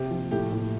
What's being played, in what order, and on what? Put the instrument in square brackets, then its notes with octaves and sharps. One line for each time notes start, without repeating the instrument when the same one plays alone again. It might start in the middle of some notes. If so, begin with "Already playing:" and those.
Already playing: [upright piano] C3 [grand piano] G4
[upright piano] F3
[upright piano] A2 [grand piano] G4
[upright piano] A2